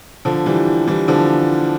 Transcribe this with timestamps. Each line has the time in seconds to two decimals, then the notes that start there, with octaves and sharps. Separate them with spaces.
0.25 D3 F3
0.46 E3 G3
0.87 E3 G3
1.08 D3 F3